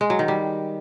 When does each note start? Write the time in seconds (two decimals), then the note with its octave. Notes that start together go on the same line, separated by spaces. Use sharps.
0.01 G#3
0.10 F#3
0.19 D#3
0.28 G3